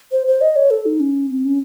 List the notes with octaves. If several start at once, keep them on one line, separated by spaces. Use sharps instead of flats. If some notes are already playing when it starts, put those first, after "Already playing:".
C5
C5
D#5
C#5
A4
D#4
C#4
C4
C#4